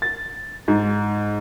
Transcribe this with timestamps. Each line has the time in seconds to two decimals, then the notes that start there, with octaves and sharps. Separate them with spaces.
0.02 A6
0.68 G#2